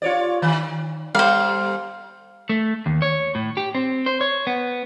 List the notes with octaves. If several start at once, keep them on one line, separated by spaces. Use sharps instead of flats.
F4 C#5 D5
D#3
G3 C5 F5
A3
D#2
C#5
A2
G4
C4
C5
C#5
B3